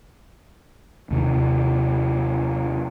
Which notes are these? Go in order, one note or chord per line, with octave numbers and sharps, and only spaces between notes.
D#2 C3 D4